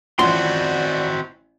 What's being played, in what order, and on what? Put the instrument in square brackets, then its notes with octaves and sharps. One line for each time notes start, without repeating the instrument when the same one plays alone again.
[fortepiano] A1 F3 F#5 [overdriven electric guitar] C4 F#4 [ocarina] D5 [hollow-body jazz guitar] C6